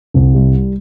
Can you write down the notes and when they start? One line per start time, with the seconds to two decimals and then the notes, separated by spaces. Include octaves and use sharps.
0.14 C2
0.34 G3